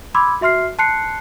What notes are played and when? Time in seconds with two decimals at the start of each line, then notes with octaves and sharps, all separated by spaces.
0.14 B5 C6 D6 E6 G#6
0.41 F#4 E5 C6 F6 C7
0.79 A5 C6 F#6 C7 C#7